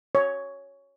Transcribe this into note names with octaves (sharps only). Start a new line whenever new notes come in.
C#5